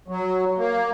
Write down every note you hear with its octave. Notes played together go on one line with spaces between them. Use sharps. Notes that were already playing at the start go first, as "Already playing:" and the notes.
F#3
A#3